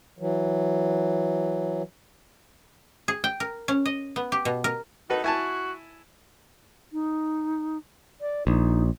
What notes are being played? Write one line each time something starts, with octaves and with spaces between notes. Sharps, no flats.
E3 F#3
G#4
G5
A#4
C#4
D#5
B3
G4
B2
A#4
D#4 F#4 A4 B4
E4 F#4 G#5 A5
D#4
D5
A#1 D#4